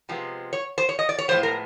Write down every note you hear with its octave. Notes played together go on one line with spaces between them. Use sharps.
C3 F3 G#3 B3
C#5
C5
C#5
D#5
D5
C#5
A2 F3 G#3 B3 C5
A#4